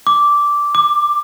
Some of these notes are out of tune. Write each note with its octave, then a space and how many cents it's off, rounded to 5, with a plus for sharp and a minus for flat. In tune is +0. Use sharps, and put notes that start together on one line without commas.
D6 -10
D6 +15